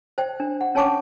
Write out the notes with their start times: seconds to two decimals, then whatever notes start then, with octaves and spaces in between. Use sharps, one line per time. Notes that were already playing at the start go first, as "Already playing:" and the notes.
0.18 C5 D5 G5
0.40 D4
0.61 F#5
0.75 C#4 C#5 G#5 A5 C#6 D6